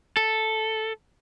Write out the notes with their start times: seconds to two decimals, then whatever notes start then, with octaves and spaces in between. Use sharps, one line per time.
0.17 A4